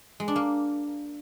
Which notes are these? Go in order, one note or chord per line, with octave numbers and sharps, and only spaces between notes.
G#3
D4
A#3